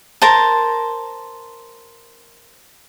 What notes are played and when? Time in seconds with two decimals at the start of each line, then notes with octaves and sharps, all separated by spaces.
0.22 A#4 C5 A5